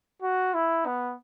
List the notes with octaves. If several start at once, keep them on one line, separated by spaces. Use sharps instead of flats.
F#4
E4
B3